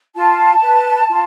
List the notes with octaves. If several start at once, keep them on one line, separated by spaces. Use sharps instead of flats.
F4 A5
B4
F4